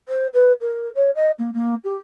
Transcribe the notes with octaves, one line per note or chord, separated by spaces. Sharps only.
C5
B4
A#4
C#5
D#5
A#3
A#3
G4